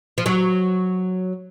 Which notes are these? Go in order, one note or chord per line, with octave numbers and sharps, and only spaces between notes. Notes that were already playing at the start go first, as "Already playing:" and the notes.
F3
F#3